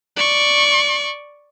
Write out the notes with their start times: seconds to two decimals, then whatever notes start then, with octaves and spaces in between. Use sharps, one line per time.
0.16 D5 C#6